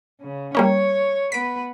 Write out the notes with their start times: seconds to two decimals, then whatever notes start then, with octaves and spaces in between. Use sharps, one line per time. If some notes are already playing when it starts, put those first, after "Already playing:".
0.21 C#3
0.55 G3 A#3 C#4 C#5
1.32 B3 B4 B6 D7